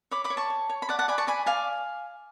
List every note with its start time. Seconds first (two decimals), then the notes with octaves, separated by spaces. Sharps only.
0.11 C#5 B5 D6
0.24 B5 D6
0.30 C#5
0.37 A5 C#6
0.50 C#5
0.69 C#5
0.82 B5
0.89 D5 F#5 A5
0.99 F#5 A5
1.08 D5 G#5 B5
1.18 A5 C#6
1.27 D5 G#5 B5
1.46 D5 F5 G#5